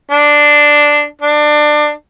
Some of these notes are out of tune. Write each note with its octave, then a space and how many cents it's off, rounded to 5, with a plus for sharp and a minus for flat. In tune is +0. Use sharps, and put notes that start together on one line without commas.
D4 +0
D4 +25